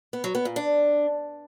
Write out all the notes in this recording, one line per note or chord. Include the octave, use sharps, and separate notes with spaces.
B3
F#3
B3
A#2
D4